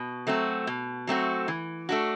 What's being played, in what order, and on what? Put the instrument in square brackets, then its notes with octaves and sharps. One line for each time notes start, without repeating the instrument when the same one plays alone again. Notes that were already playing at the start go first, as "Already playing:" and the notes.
Already playing: [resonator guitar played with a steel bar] B2
F#3 A3 C4 F#4
B2
F#3 A3 C4 F#4
E3
A3 D4 F#4